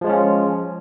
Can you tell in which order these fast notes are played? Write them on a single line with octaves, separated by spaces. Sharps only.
F3 G#3 F4 C#4